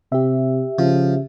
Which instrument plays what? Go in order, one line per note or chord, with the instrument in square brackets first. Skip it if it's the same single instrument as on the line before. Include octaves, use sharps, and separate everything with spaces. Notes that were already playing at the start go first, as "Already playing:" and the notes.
[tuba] C3 [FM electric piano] G4 E5
[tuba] C#3 [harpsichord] F3